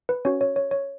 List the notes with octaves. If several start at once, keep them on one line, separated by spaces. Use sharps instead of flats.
B4
C#4 F#4 C#5
C#5
C#5
C#5